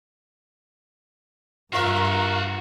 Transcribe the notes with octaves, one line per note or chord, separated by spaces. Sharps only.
G2 F4 F#4 A#4 E5 F5